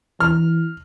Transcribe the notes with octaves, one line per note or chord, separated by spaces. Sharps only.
E3 F6